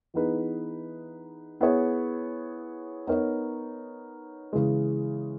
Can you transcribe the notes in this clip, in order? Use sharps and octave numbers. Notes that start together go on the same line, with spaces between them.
E3 B3 D#4 G#4 B4
B3 E4 G#4 C#5
B3 D#4 A#4 C#5
C#3 E3 G#3